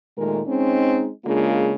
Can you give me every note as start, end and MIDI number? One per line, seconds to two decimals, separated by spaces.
0.18 0.41 46
0.18 0.41 51
0.18 0.41 56
0.18 0.41 57
0.18 0.41 70
0.47 1.09 56
0.47 1.09 60
0.47 1.09 61
0.47 1.09 63
1.25 1.74 49
1.25 1.74 56
1.25 1.74 58
1.25 1.74 62
1.25 1.74 65